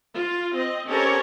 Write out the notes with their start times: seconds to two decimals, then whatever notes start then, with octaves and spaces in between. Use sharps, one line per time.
0.15 F4
0.53 C4 D#5
0.88 C4 C#4 G4 A4 A#4 C#5